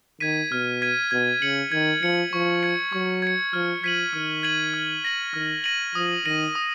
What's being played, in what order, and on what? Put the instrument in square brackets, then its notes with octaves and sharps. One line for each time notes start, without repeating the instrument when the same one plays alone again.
[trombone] D#3 [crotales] G#6 B6 D#7
[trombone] B2 [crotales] F6
[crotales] G#6 B6 D#7
[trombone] B2 [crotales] G#6
[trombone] C#3 [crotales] C#7 F#7
[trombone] D#3 [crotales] G#6
[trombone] F3 [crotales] C#7 F#7
[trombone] F3 [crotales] C#6
[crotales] G#6 C#7
[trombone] F#3 [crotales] C#6
[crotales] G#6 C#7
[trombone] F3 [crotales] F6
[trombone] F3 [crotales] G#6 B6 D#7 F#7
[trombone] D#3 [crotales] F6
[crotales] G#6 B6 D#7 F#7
F6
A#6 D#7 F#7
[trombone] D#3 [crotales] F6
[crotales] A#6 D#7 F#7
[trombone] F3 [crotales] D#6
[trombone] D#3 [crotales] A#6 D#7 F#7
[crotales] D#6